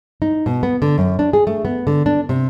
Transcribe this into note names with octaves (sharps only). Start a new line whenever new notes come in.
D#4
B2
B3
D3
F#2
D4
G#4
A3
B3
D3
D4
C3